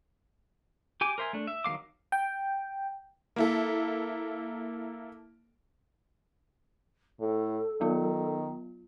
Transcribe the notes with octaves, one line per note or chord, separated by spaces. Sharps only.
G4 G#5 D6
A#4 C5 E5 G#5
A3 D4
E5
D#3 F#3 A3 F5 D6
G5
A#3 E4 A4
A2 A4
D#3 F#3 B3 F4